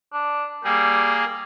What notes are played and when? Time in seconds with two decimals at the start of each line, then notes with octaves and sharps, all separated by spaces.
0.13 D4
0.64 G3 A#3 G#4